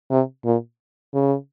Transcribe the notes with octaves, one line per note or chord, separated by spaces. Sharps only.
C3
A#2
C#3